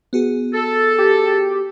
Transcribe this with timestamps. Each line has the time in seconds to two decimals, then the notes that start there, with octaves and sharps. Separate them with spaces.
0.13 B3 F#4 G#4
0.54 A4
0.98 G4